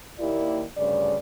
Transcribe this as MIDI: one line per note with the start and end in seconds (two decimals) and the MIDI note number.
0.19 0.62 39
0.19 0.62 58
0.19 0.62 64
0.19 0.62 67
0.19 0.62 74
0.76 1.17 38
0.76 1.17 43
0.76 1.17 49
0.76 1.17 74